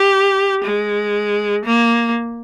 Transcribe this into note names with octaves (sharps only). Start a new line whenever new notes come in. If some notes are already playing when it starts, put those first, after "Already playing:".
Already playing: G4
G#3
A#3